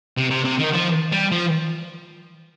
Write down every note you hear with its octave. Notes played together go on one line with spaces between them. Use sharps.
C3
C3
C3
D#3
F3
G3
F3